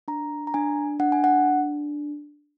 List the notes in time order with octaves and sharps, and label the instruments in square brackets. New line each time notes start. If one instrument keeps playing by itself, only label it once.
[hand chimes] D4 A#5
A#5
D4 G#5
D4 F#5
G#5
F#5